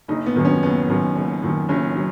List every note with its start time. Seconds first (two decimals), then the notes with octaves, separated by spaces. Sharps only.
0.08 F#1 D#4
0.26 B3
0.36 F#2 D#3 F#3
0.45 C#4
0.63 F#1 B3
0.89 F#2 D#3 F#3
1.16 F#1
1.43 F#2 D#3 F#3
1.69 F#1 C#4
1.95 F#3